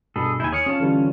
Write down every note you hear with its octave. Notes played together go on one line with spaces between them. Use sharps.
G2 B2 G#4 A4 B5
D#2 D#4 E4 G#5 G6
G#4 C#5 F6 C#7
C#4 F4 A5
D3 E3 G3